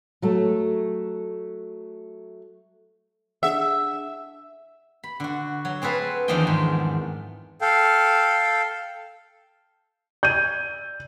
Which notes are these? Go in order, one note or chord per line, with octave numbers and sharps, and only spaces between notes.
F#3 A3 A4
D4 G#4 E5 F#5 E6
B5
D3 F#4
F#3
C4 G#4 A4 B4 F5
E2 D#3 F3 D4 D#5 G5
G#2
A4 F5 G5
D5 G6 G#6 D#7